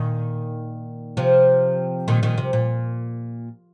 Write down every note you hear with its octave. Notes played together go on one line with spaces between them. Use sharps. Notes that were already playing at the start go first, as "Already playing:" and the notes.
Already playing: A#2 D#3
C3 F3
A#2 D#3
A#2 D#3
C3
A#2